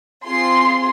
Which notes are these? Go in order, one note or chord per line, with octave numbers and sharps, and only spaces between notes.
C4 F4 G#4 C6